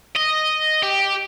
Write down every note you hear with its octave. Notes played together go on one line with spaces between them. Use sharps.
D#5
G4